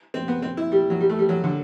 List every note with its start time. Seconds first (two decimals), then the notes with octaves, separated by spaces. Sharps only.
0.14 C4
0.28 B3
0.42 C4
0.57 E4
0.72 G3
0.90 F#3
1.01 G3
1.09 A3
1.19 G3
1.29 F#3
1.44 D3